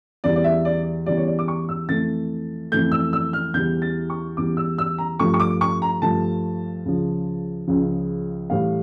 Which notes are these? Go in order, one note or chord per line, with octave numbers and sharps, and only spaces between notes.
E2 E3 G3 D5
D5
E5
D5
E2 E3 G3 D5
C#5
D5
D6
C#6
E6
F2 E3 A3 A6
F2 E3 A3 G6
E6
E6
F6
E2 E3 G3 G6
A6
C#6
E2 E3 G3 D6
E6
E6
A#5
G2 F3 A3 C#6
C#6
D6
C#6
A#5
G2 F3 A3 A5
C#2 C#3 F3
C#2 C#3 F3
A2 E3 G3 F5